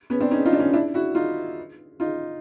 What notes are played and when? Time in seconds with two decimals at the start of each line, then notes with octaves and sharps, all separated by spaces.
0.10 B3 C#4
0.21 C4 D4
0.31 C#4 D#4
0.45 D#4 F4
0.53 D4
0.59 C#4 D#4
0.74 D4 E4
0.94 E4 F#4
1.15 D#4 F4
2.00 D#4 F4